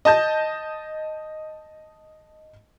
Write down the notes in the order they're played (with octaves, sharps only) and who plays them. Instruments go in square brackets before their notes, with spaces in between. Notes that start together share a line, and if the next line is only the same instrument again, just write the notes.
[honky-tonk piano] D#5 A5 G6